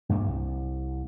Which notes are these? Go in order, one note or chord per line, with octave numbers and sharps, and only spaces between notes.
A#1 G2 A#3
C2